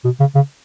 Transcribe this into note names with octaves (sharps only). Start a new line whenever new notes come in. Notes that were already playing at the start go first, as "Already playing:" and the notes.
B2
C#3
C#3